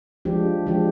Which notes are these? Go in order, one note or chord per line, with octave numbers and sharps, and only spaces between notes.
F3 G#3 D4 G4
F3 G#3 D4 G4